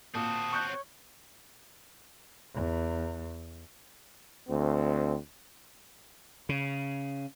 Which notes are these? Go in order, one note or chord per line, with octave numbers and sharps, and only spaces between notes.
A#2 C4 F#4 A5 D#6
C#6 F#6 G6
C#5
E2
D2 C4
C#3